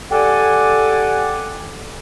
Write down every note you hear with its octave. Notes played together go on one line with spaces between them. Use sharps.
G4 A4 D5 F#5 G#5